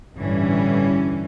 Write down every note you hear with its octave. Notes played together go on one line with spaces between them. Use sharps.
A1 G2 D3 E3 G3 C#4